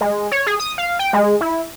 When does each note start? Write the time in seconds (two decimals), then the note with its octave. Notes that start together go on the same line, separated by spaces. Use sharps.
0.01 G#3
0.32 C#5
0.47 G#4
0.60 D#6
0.78 F5
0.99 G5
1.13 G#3
1.41 E4